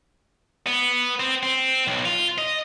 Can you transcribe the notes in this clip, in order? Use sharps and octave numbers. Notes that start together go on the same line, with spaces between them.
B3
C4
C4
B1
F4
D#5